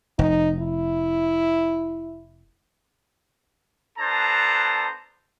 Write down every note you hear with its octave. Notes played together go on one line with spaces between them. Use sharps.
F1 D#4
E4
B3 D4 A4 C5 A5 A#5